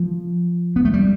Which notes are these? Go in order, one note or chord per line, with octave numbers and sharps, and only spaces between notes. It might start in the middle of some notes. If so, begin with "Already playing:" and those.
Already playing: F3
B3
A3
G3